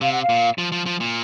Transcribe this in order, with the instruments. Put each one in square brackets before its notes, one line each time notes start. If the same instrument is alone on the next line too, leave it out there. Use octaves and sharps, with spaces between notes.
[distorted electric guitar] C3 [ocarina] F5
[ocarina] F#5
F5
[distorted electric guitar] A#2
F3
F3
F3
A#2